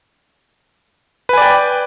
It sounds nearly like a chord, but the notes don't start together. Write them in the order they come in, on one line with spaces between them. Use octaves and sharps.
B4 G#5 D5 G5